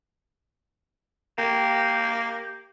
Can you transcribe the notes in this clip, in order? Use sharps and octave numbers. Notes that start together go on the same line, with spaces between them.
A#3 G4